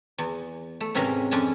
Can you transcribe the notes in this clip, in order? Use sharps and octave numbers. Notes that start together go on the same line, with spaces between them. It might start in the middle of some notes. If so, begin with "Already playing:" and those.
E2
A3
G#2 C3 E3 C#4 A#4
F2 C#4 D4 G#5